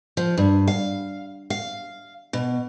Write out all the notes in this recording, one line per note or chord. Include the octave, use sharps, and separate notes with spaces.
F3
G2
F5
F5
B2